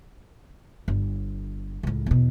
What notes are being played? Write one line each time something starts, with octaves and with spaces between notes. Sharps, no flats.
G1
C#2 A2
E2 B2